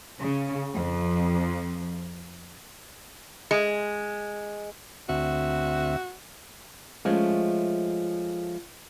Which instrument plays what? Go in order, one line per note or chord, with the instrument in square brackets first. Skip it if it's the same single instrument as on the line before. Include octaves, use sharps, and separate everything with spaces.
[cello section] C#3
F2
[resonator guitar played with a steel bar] G#3
[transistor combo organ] D2 C4 E5 [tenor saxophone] F#4
[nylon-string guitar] F3 G#3 A3 C#4